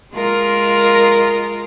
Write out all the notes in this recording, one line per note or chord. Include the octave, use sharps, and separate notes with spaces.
G#3 F4 A#4